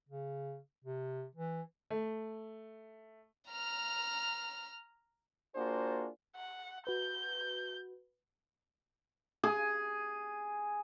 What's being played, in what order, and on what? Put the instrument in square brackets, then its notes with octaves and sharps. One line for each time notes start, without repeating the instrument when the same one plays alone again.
[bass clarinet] C#3
C3
E3
[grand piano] A3
[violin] A#5 F6
[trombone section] A#3 D4 F4 F#4 G#4 C5
[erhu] F#5
[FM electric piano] F#4 B4 [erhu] G6
[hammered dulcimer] G#4